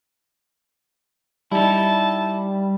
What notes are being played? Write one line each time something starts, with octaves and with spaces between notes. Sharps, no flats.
G3 D#4 E4 A5